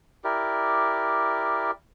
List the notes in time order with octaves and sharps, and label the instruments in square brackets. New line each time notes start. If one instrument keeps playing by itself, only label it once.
[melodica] E4 G4 A#4 D5